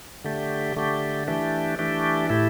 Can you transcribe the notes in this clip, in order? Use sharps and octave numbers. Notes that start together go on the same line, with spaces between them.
D3 A3 G4
D3 A3 G4
E3 A3 D4 G4
E3 A3 D4 G4
A2 A3 E4 G4